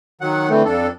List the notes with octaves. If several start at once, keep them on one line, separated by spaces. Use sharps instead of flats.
D#3 F#3 F#5
D3 E3 A3 C4
F2 D4 A4